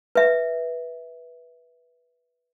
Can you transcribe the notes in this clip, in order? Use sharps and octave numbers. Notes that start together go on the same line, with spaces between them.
B4 E5